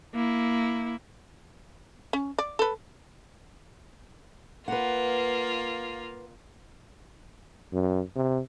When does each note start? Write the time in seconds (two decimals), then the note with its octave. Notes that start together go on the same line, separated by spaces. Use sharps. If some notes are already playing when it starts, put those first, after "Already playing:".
0.15 A#3 E4
2.13 C#4
2.38 D5
2.59 A4 B4
4.68 A#3 F4 B4 F#5
7.73 F#2
8.16 C3